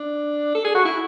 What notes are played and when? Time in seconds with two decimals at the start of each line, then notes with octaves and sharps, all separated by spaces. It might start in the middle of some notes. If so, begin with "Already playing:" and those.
Already playing: D4
0.55 A4
0.65 G#4
0.75 F#4
0.85 E4